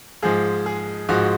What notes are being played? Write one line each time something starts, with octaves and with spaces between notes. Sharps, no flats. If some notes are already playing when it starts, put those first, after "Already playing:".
G#2 F3 G#3 G#4
G#4
G#2 F3 G#3 F#4